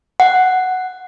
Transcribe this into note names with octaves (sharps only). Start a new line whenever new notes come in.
F#5